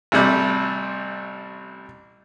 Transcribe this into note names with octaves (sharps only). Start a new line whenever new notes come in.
A1 C3 G3 A3